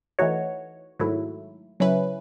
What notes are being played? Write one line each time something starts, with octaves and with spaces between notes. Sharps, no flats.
E3 A3 D#4 F#4 C#5
G#2 D#3 F#3 A3 E4
C#3 F#3 C#4 E4 B4